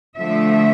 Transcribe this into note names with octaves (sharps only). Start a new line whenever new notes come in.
D3 F3 A3 E5